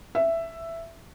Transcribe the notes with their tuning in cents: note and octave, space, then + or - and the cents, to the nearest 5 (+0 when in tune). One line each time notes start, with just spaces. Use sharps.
E5 +10